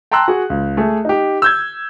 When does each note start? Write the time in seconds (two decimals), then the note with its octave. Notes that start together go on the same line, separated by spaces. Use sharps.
0.11 G5 A5 A#5 C6 E6 F#6
0.28 F#4 G#4
0.50 C#2
0.77 A3 G#4
1.05 D#4 G4
1.42 E6 G6 G#6